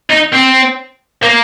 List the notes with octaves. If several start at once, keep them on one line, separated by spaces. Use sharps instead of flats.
D#4
C4
A#3